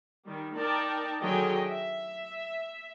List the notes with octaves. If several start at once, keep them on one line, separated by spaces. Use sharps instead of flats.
D#3 G3
D#4 A#4 D5 G5 A5
D3 D#3 F#3 G#4 D#5 G5
E5